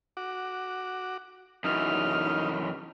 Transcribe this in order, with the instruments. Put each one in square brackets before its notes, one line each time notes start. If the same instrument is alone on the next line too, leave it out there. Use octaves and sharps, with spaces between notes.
[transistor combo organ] F#4 D6
[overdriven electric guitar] F#2 E3 [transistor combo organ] D#4 [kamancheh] F6